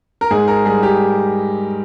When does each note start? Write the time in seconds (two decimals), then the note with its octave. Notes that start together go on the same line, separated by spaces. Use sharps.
0.21 A#4
0.31 G#2 G#4
0.48 A#4
0.66 G3 G#4
0.83 G4